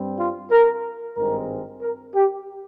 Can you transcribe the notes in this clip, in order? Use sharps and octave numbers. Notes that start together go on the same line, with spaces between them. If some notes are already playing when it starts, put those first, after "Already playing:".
Already playing: G2 G3 C4
F4
A#4
G#1 G2 D#3 G#3 C4 A#4
A#4
G4